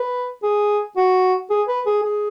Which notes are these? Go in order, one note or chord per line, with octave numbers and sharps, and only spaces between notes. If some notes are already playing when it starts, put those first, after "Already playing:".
Already playing: B4
G#4
F#4
G#4
B4
G#4
G#4